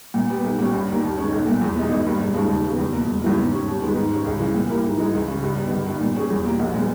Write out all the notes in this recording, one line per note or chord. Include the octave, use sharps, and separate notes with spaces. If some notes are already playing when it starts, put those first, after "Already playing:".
A#2
G3 B3 G4
B1
A#2 G3 C#4 G4
G2
D#3 G3 A#3
D#2
D#3 G#3 C#4
B1
A#2 A#3
E2
B2 G#3 D#4
G#1
G2 D#3 G3 A#3
E1
D#2 C#3 G#3
D#2
C#3 G3 B3
E2
B2 A#3
E1
E2 C#3 E3 A#3
G#2
G3 C#4
D#2
D#3 G#3 B3
G#2
D#3 G3 C#4
C#2
C#3 E3
A#2
G3 A#3 E4 A#4
G#2
E3 G#3 D#4
C#2
C#3 G3
G2
G3 B3 D#4
G1
G2 D#3
A#2
G3 C#4 G#4
E2
B2 G3 A#3
A#1
A#2 G#3 B3